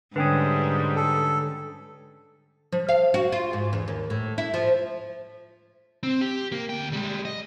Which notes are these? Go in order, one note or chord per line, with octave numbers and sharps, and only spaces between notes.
G#2 D3 G3 C#4 B4 G5 D#6
A4
F3
F5
F#4
F4
G#2
E2
D#2
A2
E4
F3
C4
G4
A#3
D2 G5
G3 G#3
D#5